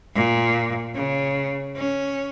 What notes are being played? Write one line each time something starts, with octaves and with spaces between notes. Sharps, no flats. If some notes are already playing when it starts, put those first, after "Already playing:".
A#2
C#3
C#4